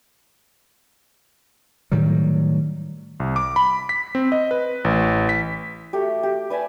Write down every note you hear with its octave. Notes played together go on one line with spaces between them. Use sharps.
A2 D#3 F#3 G3
C2
D6
B5
B6
C4
D#5
B4
A1
B6
A3 F#4 G4
G4
B4 D5 E5 G#5